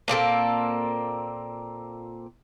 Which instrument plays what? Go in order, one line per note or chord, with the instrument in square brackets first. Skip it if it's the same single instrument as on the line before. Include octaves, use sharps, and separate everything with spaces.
[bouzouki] A#2 A#3 C4 A4